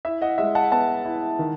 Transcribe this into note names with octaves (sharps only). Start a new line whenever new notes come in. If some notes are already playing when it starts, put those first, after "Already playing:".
E4 E5
D#5 F#5
G#3 E5
F#5 A5
B3 F#5 A5
E4
D#3